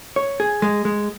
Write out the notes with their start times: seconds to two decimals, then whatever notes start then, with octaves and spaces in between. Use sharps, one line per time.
0.16 C#5
0.40 G#4
0.62 G#3
0.85 G#3